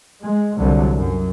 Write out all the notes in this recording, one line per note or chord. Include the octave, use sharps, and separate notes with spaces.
G#3
C2 D3 F#3
F#2